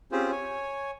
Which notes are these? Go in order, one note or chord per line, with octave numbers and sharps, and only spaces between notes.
C4 C#4 F4 G4 G#4 C5
C#5 G#5